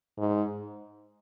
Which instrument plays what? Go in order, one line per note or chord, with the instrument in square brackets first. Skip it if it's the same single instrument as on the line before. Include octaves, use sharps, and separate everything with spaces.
[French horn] G#2